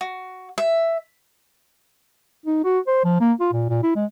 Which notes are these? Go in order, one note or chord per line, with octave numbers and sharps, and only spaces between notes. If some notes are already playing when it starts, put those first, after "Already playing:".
F#4
E5
D#4
F#4
C5
F3
A#3
F4
A#2
A#2
E4
G#3